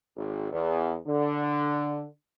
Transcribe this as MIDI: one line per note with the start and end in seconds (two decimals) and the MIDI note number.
0.16 0.48 32
0.52 0.95 40
1.07 2.03 50